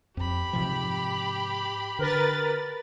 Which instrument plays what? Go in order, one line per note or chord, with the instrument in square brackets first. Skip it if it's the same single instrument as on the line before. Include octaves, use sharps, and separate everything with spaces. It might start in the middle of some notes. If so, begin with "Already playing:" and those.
[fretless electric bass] F2 [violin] G4 B5
[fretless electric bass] G#2 C3 F3
[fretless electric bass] D3 [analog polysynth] A#4 B4 A6